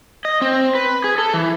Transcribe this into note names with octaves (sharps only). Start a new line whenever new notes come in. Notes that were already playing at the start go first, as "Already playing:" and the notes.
D#5
C4
B4
G#4
A4
E3